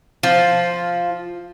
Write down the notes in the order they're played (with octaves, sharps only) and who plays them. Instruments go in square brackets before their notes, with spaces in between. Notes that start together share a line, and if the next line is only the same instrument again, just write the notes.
[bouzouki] F3